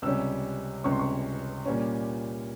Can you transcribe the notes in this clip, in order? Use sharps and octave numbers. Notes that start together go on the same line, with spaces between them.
C#2 C3 G3 C#4 E6
C#2 C3 G3 C#4 C#6
C6
C#6
A#2 G3 A#3 C#4